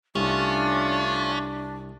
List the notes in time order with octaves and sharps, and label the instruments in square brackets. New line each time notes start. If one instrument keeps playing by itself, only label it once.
[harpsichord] C2 [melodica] A3 F4 [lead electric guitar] C#4 [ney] D4